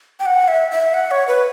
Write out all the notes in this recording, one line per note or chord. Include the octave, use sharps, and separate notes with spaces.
G5
F#5
E5
E5
F#5
C#5
B4